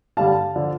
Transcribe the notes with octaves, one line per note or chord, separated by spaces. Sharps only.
G2 D3 G3 F5 A5
D3 F3